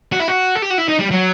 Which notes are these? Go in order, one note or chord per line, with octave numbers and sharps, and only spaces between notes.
F#4
E4
F#4
A4
G4
F#4
E4
D#4
G3
F#3